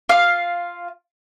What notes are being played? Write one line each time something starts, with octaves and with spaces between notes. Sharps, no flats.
F4 F5